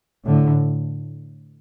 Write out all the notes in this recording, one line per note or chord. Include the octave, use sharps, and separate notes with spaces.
A2 D3